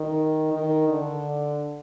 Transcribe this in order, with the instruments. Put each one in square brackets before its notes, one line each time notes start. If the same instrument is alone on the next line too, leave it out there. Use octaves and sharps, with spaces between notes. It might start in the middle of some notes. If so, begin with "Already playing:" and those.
Already playing: [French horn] D#3
D#3
D3